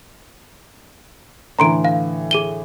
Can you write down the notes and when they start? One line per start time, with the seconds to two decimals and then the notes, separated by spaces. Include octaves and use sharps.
1.59 A2 D3 E3 A#5 C6 D7
1.85 F5
2.31 G#4 D#7 G7